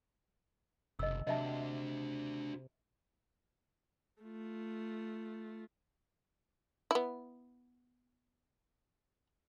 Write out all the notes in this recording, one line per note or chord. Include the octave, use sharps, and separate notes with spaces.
F#1 C3 D#3 D#5 E6
C3 D4 F#4 D#5 E5 A5
A3 F4
B3 E4